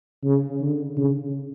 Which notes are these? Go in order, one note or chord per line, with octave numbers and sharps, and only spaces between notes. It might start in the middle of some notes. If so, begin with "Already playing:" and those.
C#3
D3
C#3